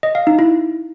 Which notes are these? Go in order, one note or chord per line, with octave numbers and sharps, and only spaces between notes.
D#5
F5
D#4
E4